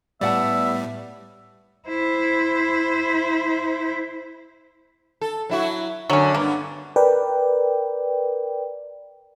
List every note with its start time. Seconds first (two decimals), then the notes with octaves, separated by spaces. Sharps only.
0.21 A2 G3 B3 D5 E5 F#5 A5
1.88 E4 C5
5.21 A4
5.50 F#3 E4 F#4
6.09 F#2 D3 F#3 C#4
6.35 G2 A#3 B3
6.96 A#4 B4 D5 G5